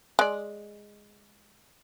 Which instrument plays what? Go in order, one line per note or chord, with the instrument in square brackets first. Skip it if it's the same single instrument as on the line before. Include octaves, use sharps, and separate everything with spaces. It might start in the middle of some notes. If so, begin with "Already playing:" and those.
[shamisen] G#3 D5